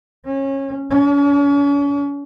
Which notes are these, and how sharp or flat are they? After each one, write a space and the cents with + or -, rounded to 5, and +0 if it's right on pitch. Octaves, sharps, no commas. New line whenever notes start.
C#4 -25
C#4 +40